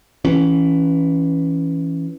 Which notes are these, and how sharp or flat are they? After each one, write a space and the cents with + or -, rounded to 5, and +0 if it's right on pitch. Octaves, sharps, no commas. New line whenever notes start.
E3 +0 C#4 +0